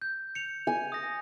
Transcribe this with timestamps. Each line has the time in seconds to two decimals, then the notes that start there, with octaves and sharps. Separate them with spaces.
0.02 G6
0.35 C#7 F7
0.67 G#5
0.92 D#6 A#6